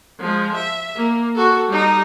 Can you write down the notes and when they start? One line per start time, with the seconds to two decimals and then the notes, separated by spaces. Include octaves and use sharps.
0.20 F3 G#3
0.55 E5
0.96 A#3
1.35 F#4 A4
1.68 G3 D#4